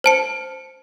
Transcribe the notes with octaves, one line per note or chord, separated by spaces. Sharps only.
C5 A5 C#7